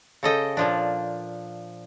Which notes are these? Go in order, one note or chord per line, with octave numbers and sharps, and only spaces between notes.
C#3 A4 D#5 G5
A#2 F3 D4